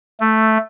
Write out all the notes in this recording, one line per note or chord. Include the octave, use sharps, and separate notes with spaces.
A3